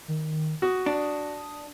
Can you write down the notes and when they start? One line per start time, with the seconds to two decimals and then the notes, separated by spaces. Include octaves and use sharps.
0.08 D#3
0.62 F#4 D#6
0.86 D4